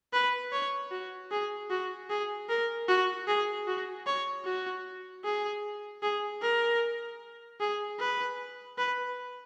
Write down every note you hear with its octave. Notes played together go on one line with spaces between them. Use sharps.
B4
C#5
F#4
G#4
F#4
G#4
A#4
F#4
G#4
F#4
C#5
F#4
G#4
G#4
A#4
G#4
B4
B4